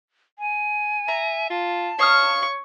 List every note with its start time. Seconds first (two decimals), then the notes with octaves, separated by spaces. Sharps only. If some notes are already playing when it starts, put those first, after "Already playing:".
0.39 G#5
1.08 E5 A#5
1.50 F4 A5
1.99 C#5 F5 C#6 D#6 F6